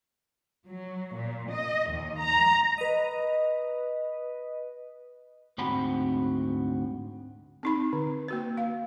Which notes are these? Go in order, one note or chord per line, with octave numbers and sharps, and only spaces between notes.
F#3
A#2
D#5
D#2
A#5
B4 D#5
D2 G#2 C4 F#4 B5
C4 D#4 B5
D3
A#3 F#4 B4
F5